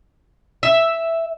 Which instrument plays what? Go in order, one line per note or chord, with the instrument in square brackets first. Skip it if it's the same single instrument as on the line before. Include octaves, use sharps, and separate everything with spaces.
[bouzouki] E5